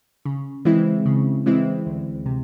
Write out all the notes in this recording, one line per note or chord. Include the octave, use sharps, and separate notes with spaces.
C#3
E3 G#3 C4 E4
C#3
E3 G#3 C4 E4
D2
C3